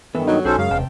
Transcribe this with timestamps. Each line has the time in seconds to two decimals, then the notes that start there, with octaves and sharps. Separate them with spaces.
0.15 G2 D#3 E3 B3 A4
0.28 F#3 D#4
0.45 B1 C#4 D#4 F#4 G#4 A4 C5
0.58 F#2 C#3 G#3 F5
0.71 E1 C3 G5 A5